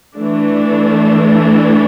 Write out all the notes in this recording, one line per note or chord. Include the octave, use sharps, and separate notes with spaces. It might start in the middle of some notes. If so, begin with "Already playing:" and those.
E3 A3 D4